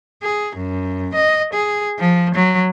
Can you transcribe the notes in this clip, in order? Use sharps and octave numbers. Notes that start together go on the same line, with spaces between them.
G#4
F#2
D#5
G#4
F3
F#3